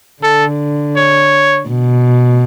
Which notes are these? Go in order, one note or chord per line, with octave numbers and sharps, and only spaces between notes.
D3 A4
C#5
B2